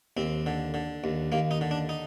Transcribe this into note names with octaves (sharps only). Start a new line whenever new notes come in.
D#2 C4
D3
D3
D#2
D#2 A#3
D#4
D3
D4
D#4